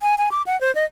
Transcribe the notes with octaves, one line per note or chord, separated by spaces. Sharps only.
G#5
G#5
D6
F#5
C5
D#5